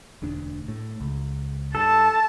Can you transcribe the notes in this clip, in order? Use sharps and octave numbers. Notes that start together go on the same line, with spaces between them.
E1 D2 D4
A2
C#2
G2 A4 A5